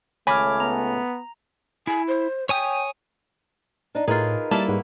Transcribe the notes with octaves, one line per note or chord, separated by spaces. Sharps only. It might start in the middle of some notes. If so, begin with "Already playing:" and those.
C#2 A3 C#5 G#5 B5 D6 F6
B3 A#5
E4 G#5
C5
C#5 G5 G#5 D#6
D4 D#4
A2 D#4 F4 G#4 A#4 B4
G3 A#3 E4 A5
G#2 F#4 B4